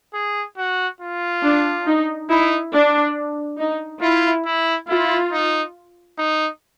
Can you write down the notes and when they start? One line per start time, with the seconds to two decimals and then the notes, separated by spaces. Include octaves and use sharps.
0.14 G#4
0.57 F#4
1.01 F4
1.43 D4
1.86 D#4
2.29 D#4 E4
2.73 D4
3.59 D#4
4.02 E4 F4
4.46 E4
4.88 E4 F4
5.32 D#4
6.18 D#4